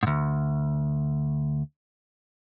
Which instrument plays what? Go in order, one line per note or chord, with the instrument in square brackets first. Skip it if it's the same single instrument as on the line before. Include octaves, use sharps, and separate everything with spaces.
[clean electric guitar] D2 G#2